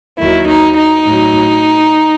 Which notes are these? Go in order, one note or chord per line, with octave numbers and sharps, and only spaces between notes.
D#2 D#3 F#3 E4
D#4
D#4
A2 F#3